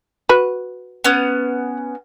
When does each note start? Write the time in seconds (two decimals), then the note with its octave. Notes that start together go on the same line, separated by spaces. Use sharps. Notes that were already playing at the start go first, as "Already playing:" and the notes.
0.29 F#4 B4
1.04 B3 C#4